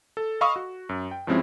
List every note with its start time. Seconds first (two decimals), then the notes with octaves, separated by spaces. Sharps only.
0.17 A4
0.41 D#5 F5 B5 C#6 D#6 E6
0.56 F#4
0.89 F#2
1.11 G5
1.27 G2 F3 G#3 C4 C#4 E4